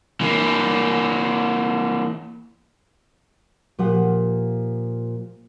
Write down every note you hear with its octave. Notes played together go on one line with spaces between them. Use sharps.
E3 A#3
A#2 F3 G4 F#5